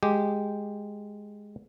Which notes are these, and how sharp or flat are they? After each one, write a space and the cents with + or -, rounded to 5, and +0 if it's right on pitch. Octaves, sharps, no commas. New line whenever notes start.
G#3 +0 G4 +0